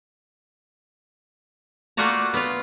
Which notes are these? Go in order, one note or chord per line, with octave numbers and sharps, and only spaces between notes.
A3 A#3 F4 F#4 D5 A#5
B3 F4